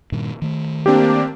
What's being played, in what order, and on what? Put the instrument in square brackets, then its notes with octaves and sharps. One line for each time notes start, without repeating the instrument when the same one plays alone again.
[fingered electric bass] G2 A#2 D#3
D#3 A3
[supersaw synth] A#3 D4 [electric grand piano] C4 G4